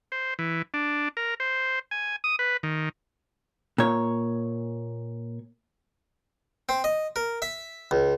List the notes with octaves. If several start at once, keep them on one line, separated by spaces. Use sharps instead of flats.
C5
E3
D4
A#4
C5
G#5
D#6
B4
D#3
A#2 C#5
C4
D#5
A#4
E5
C#2